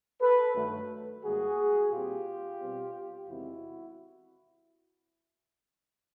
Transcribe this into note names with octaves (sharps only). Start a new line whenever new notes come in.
A4 B4
G2 D#3 F#3 A3
G#2 D#3 G3 A#3 F#4 G#4
A#2 G3 C4 F4 G4
B2 G3 C4
E2 C3 D#3 G#3 C4 E4 F#4